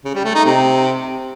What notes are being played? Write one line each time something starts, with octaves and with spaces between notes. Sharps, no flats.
C#3
G3
A3
D#4
C3